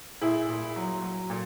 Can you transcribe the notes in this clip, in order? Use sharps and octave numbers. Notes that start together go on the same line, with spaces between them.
A#2 E4 G#4
A#2
F#3
F#3
A#2